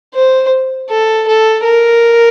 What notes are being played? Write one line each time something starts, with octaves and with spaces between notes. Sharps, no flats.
C5
A4
A4
A#4